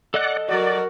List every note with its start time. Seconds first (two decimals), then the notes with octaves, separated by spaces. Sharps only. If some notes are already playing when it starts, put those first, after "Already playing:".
0.14 A4 D5 D#5 F#5 F#6
0.49 F#3 F#4 A#4 D5